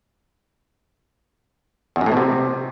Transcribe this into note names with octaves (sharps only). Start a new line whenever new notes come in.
E2
F#2
A2
B2
C3